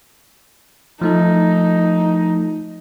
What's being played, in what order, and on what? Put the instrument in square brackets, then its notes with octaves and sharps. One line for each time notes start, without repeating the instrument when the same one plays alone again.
[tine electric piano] F3 A3 A4 [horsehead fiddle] D#4